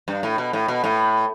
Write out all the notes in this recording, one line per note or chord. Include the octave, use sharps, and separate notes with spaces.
G2
A2
B2
A2
B2
A2